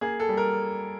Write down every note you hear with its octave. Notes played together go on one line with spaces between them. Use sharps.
A#3 G#4
A4
G3
A#4